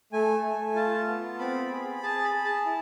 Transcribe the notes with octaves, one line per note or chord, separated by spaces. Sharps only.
A3 G#5
A3
F4 A5
B3
C4 B5
G#4
G#4 A5
B5
G#4
A5
E4